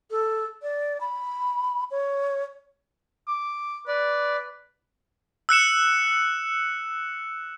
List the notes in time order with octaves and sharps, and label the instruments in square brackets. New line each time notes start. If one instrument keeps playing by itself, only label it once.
[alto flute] A4
D5
B5
C#5
[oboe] D6
[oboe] B4 [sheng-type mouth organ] D5
[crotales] E6 F#6 C#7 E7